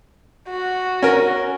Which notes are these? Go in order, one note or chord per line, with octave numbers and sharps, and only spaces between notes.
F#4
C#4 A#4